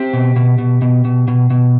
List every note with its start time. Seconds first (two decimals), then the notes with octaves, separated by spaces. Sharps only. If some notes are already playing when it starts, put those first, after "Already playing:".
Already playing: C4 G4
0.13 B2
0.36 B2
0.58 B2
0.82 B2
1.05 B2
1.28 B2
1.50 B2